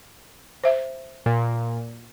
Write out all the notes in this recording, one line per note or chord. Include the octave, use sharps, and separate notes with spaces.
C5 E5
A#2